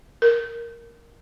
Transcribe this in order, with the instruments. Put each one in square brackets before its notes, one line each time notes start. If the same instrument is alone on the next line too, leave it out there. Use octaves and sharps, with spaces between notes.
[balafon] A#4